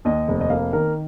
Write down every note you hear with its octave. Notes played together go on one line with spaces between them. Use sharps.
D#2 D#5
F1
D#5
A#3 F5
D#3 A#4